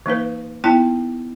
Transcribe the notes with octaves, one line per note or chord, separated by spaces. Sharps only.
E3 A#3 D#4 B4
B3 D#4 E4 G5 A5